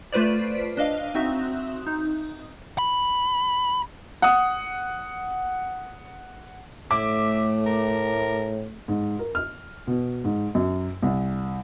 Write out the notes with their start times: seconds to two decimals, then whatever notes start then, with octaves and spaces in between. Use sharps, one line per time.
0.12 A3 F4 B4 C5 D5
0.77 D4 D#5 F5
1.15 C4 D#4 F#4 E5
1.87 D#4
2.78 B5
4.22 F#5 D#6
6.91 A2 A3 E5 D6
7.67 A#4
8.88 G#2
9.19 A#4
9.35 F6
9.87 B2
10.24 G#2
10.55 F#2
11.02 C2